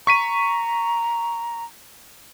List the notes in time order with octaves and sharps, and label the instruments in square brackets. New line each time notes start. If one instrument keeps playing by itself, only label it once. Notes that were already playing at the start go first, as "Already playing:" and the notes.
[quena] A#5 [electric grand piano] C#6 B6 D#7